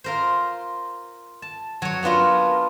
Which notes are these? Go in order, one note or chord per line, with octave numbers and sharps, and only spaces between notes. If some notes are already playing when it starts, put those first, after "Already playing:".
F4 A#4 C5
A5
F#3 C#5
B3 D4 F4 A#4